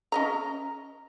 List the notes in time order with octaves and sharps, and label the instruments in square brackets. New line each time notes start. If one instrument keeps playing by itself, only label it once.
[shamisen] C#4 D#5 A#5